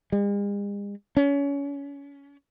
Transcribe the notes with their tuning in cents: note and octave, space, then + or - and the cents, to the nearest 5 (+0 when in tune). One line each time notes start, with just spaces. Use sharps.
G#3 -45
C#4 +25